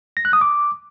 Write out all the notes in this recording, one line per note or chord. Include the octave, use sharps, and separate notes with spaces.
A#6
F#6
D#6
D6